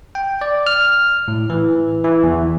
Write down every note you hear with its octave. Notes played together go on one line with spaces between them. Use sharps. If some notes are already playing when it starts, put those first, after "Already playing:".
G5
D5
F6
A2
E3
E3
E2